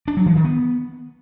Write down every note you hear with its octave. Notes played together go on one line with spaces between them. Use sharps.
D4
F#3
E3
D#3
B3